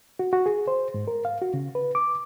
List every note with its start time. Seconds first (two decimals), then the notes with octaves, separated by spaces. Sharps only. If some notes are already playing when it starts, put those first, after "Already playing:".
0.19 F#4
0.33 F#4
0.46 G#4
0.68 C5
0.94 G#2
1.08 A#4
1.25 F5
1.42 F#4
1.54 C#3
1.75 B4
1.95 D6